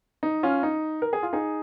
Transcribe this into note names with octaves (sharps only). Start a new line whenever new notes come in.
D#4
C#4 F4
D#4
A#4
G#4
F4
D#4 G#4